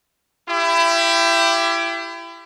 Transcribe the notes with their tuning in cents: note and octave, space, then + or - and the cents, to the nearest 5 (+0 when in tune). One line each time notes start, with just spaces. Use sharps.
E4 +30 G4 +0